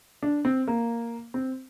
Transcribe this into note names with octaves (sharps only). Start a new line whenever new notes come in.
D4
C4
A#3
C4